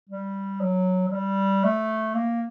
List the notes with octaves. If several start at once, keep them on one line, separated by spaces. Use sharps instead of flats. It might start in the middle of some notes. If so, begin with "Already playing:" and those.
G3
F#3
F#3
G3
A3
A#3